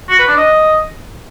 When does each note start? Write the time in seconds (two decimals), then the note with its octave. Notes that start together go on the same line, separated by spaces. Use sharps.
0.10 F#4
0.19 B4
0.28 D4
0.37 D#5